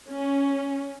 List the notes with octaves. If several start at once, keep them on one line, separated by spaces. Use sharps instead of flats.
C#4